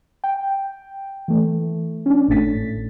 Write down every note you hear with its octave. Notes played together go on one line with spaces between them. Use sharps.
G5
E3 A3
C#4 D4
G#1 A2 A3 A6 B6